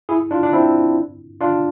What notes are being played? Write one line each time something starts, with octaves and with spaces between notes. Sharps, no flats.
E4 G#4
D4 F4
D4
C4 E4
D4 F4